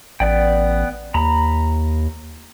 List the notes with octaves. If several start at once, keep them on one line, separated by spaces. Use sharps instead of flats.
A1 B3 D5 G5
D#2 A#5 B5